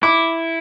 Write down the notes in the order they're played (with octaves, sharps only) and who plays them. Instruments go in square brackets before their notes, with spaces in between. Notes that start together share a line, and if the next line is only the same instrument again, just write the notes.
[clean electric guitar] E4 [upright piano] D6